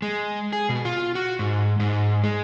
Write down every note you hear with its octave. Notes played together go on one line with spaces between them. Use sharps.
G#3
G#4
B2
F4
F#4
G#2
G#2
G#3